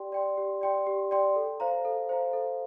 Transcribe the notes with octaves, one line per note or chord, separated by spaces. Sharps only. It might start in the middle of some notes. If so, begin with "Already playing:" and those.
Already playing: G4 D5 G5 C6
D5 G5 C6
G4
D5 G5 C6
G4
D5 G5 C6
A4
C5 F5 A#5
A4
C5 F5 A#5
A4